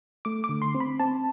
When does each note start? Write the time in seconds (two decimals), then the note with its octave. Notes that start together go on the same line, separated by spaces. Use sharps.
0.25 A3 D6
0.44 D6
0.49 D3
0.62 C6
0.74 C4
0.80 B5
1.00 C4 A5